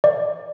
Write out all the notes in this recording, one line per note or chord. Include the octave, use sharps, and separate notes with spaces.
D5